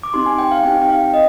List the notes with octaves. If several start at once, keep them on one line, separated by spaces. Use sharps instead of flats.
D6
C4 D#4 G4 C6
G#5
G5
F5
C4 D#4 G4 G5
G5
F5
D#5